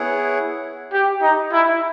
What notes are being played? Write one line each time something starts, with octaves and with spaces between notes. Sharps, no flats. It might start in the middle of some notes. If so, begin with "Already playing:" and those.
Already playing: B3 E4 G#4 C#5 F#5
G4
D#4
E4